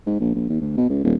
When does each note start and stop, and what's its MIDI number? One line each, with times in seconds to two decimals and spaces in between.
0.07 0.20 44
0.20 0.32 34
0.35 0.47 34
0.49 0.60 39
0.61 0.75 38
0.77 0.86 47
0.89 1.02 37
1.04 1.14 27